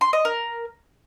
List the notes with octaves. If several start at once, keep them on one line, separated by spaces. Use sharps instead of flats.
C6
D#5
A#4